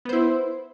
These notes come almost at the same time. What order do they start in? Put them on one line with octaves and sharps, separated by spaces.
B3 C5 E4